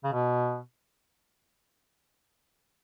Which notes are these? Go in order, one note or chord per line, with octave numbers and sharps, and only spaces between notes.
C#3
B2